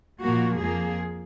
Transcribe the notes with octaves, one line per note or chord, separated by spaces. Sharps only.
A#2 F3 A#3 F#4
F2 F3 A#3 G#4